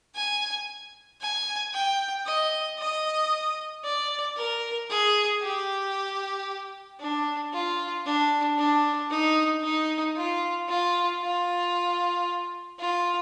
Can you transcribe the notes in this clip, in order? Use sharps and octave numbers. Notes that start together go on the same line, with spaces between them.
G#5
G#5
G5
D#5
D#5
D5
A#4
G#4
G4
D4
F4
D4
D4
D#4
D#4
F4
F4
F4
F4